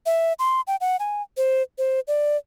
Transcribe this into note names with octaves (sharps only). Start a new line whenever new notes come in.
E5
C6
G5
F#5
G#5
C5
C5
D5